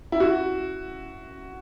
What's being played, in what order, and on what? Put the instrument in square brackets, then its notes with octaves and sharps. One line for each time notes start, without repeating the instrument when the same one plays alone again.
[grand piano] E4
F#4